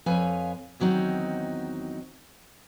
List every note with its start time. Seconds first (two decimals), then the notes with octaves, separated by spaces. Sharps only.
0.06 F2 B4 C#5 F5 G#5
0.80 E2 D#3 F#3 C4 D#4